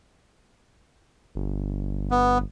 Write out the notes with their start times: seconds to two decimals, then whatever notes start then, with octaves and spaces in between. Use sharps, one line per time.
1.35 G1
2.11 B3